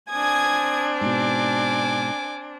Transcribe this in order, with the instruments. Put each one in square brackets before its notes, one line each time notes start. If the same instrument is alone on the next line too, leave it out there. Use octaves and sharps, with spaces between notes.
[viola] C4 D4 [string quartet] G#5 D#6 G#6
[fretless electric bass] G#2 B2 [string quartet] G#5 D6